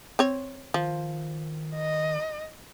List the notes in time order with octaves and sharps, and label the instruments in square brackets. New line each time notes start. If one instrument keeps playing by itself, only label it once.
[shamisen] C4 C#5
[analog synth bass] D#3 [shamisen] F3
[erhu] D#5